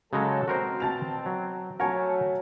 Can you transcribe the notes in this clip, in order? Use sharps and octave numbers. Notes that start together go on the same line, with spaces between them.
C#3 F#3 G#3 A4 A#5
B2 C4 F#4 A#4 C5
A5 A6 F7
F#3
F#3 A3 A#4 C#5 F#5 G#5 A5